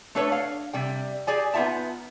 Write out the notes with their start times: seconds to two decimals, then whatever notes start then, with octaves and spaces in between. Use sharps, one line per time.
0.15 A3 D4 A4 B4 C#5
0.32 F5
0.73 C3 G3 G5
1.27 G4 G#4 D5 G#5
1.54 B3 D#4 F4 E5 A5